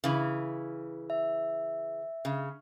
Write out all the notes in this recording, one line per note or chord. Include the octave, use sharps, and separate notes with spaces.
C#3 E3
E5
C#3